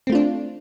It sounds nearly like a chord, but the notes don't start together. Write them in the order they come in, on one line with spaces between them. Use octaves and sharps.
C4 A3 F4 D4